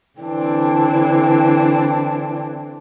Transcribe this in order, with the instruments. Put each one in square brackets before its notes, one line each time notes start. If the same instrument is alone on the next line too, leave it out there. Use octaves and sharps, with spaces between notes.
[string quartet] D3 E3 C4 D4